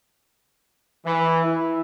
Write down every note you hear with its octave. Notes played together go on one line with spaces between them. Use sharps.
E3
E4